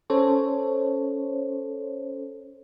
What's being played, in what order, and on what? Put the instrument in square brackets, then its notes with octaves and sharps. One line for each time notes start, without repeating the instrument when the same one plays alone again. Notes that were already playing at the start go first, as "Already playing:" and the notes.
[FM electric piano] C#4 A4 C5 C#5